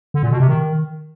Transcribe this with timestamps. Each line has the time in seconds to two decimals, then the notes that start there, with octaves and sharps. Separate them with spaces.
0.14 D3
0.23 A#2
0.31 B2
0.40 C3
0.49 D#3